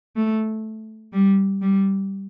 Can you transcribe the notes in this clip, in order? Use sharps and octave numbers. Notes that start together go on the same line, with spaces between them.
A3
G3
G3